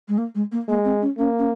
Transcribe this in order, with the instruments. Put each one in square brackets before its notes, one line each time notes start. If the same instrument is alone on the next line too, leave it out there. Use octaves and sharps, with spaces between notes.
[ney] G#3
A#3
G#3
A#3
[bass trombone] G#3 [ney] A#3
[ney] C4
C#4
[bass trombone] A#3 [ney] C#4
[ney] C#4